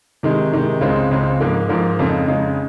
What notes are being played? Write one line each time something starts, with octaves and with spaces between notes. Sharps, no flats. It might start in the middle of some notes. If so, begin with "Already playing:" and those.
C3 D#3 G#3
C3 D#3 G#3
C#2 C#3 G#3 C4 D#4
C#2 C#3 G#3 C4 D#4
G#2 F3 A#3
G#2 F3 A#3
F2 C#3 G#3 D#4
F2 C#3 G#3 D#4